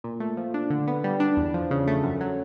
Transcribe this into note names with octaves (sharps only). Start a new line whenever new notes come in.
A#2
A3
F3
D4
D3
B3
G3
D4
E2
F3
C#3
A3
F#2
F#3